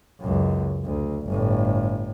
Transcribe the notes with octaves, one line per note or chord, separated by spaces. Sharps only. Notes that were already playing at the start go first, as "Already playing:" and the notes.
C#2 F#2
D2
G1 A2